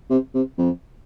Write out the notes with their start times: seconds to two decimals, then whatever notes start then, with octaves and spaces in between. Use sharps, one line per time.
0.10 C3
0.34 C3
0.58 F2